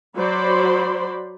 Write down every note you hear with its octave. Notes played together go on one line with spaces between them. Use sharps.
F#3 F#4 C5 D5 B5 C6